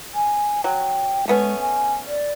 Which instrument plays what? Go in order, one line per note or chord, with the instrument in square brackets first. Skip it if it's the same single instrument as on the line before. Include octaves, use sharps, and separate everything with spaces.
[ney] G#5
[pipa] F#3 [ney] G5
[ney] G#3 [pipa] A3 B3 C#4
[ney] G#5
D5